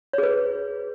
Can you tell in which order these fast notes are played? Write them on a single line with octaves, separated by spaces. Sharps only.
C#5 G#4 B4